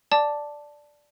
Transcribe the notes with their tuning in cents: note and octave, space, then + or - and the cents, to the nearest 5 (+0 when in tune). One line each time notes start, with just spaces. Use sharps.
D5 +0 A5 +0 D6 +0